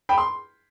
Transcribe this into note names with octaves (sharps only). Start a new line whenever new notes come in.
G5 B5
C6